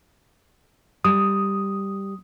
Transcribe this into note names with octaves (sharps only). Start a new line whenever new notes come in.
G3 D#6